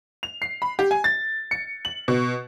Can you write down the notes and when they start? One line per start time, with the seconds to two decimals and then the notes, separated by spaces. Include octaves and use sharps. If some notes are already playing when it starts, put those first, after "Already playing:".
0.23 F7
0.42 C7
0.62 B5
0.79 G4
0.91 G#5
1.04 A6
1.51 C#7
1.85 F#7
2.08 B2